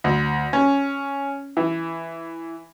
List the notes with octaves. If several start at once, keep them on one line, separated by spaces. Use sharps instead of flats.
D2
C#4
E3